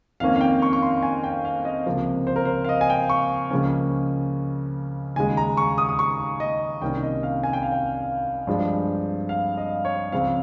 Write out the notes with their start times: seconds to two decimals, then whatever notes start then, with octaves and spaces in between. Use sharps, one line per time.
0.20 F2 D#3 A#3 C#4 F5
0.36 F5
0.41 G5
0.62 C#6
0.73 C#6
0.83 C6
1.03 G#5
1.24 G5
1.45 F5
1.65 D#5
1.86 C#2 C3 F3 A#3
2.27 C5
2.36 A#4
2.45 C5
2.64 F5
2.69 D#5
2.81 G#5
2.90 G5
3.10 C#6
3.51 C#2 C#3 F3 A#3 C#4
5.16 D#2 C#3 G#3 G#5
5.37 A#5
5.57 C#6
5.78 D#6
5.89 D#6
5.99 C#6
6.40 D#5
6.82 C2 C3 D#3 A#3 C#4 G5
7.03 D#5
7.23 F5
7.43 G#5
7.53 G5
7.63 F5
7.72 G5
8.47 G2 F3 G#3
9.29 F5
9.57 D#5
9.85 C#5
10.12 C#2 C#3 F3 C4 F5